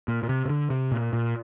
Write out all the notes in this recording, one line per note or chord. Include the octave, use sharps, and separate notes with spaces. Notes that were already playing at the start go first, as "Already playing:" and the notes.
A#2
A#2
C3
C3
D3
C3
A#2
A#2